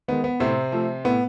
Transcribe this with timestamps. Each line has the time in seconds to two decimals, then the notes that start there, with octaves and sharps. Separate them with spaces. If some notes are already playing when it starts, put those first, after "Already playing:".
0.08 D#3 G#3 B3
0.24 B3
0.40 A2 C3 C4
0.72 F3 A3
1.04 A2 B3